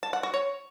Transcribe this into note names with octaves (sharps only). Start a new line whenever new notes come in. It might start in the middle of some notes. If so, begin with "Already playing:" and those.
A5
F#5
F#4
C#5